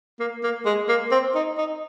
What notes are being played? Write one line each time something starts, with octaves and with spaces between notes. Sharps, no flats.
A#3
A#3
G#3
A#3
C4
D#4
D#4